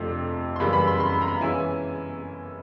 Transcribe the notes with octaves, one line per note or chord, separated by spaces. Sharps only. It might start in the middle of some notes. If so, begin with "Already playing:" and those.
Already playing: F2 C3 F3 A3 D4
C6
F#2 C#3 E3 G3 A#3 B5
B5
C6
C6
B5
A#5
B5
E3 G#3 C#4 E4 G#5